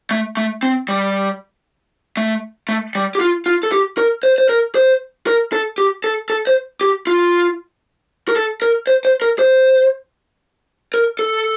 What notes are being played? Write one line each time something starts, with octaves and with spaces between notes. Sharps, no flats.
A3
A3
C4
G3
A3
A3
G3
G4
F4
F4
A4
G4
A#4
C5
C5
A#4
C5
A#4
A4
G4
A4
A4
C5
G4
F4
A#4
A4
A#4
C5
C5
A#4
C5
A#4
A4